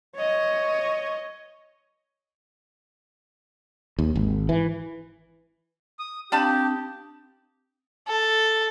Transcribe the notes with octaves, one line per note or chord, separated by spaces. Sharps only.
C#5 D#5
D#2
G#1
E3
D#6
C4 D4 F4 G4 A5 B5 D#6
A4